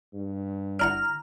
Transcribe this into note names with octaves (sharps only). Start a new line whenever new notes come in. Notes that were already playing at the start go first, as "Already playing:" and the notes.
G2
D4 E4 F#5 A#5 F6